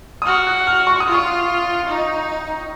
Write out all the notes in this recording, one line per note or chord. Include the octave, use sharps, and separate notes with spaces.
D#6
F#4 F6
F#6
F6
C#6
D#6
F4 C#6
D#4